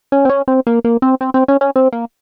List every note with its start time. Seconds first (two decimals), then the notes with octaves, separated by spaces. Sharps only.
0.12 C#4
0.25 C4
0.29 C#4
0.48 C4
0.67 A#3
0.84 A#3
1.02 C4
1.21 C4
1.34 C4
1.48 C#4
1.61 C#4
1.76 C4
1.93 A#3